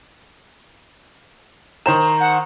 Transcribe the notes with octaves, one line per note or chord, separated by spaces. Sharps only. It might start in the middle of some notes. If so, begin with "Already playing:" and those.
D#3 C5 A#5 E7
F#5